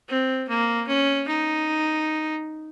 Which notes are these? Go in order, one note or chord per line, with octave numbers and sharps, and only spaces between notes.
C4
A#3
C#4
D#4